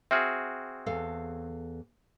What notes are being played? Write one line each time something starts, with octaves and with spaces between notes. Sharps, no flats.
C4 F#4 G#4 E5 F6
E2 A4 F5